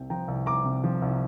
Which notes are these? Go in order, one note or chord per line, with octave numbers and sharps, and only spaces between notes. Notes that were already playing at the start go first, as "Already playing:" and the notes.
Already playing: C2 C3 G5
F3 G5 A#5
C2
C2 A#5 D6
C3
F3
C2